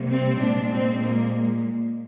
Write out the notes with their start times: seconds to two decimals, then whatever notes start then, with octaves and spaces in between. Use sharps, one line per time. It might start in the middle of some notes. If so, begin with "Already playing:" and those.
Already playing: C3 G3 A#3
0.09 C4
0.40 A#2 G#3 D4
0.71 C4
1.03 A#3